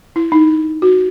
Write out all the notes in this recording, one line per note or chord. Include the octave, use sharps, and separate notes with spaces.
E4
D#4
F#4